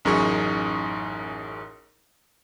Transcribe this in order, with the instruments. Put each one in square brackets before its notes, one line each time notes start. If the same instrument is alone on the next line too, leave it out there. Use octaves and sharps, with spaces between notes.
[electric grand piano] A1 F#2 D#4 G#4 C#6